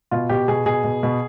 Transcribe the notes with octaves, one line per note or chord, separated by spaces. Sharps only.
B2 F4
B2 G4
B2 G#4
B2 G#4
B2
B2